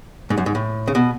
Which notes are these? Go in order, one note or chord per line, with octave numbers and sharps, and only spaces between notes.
G#2
F#2
G#2
A2
C#3
B2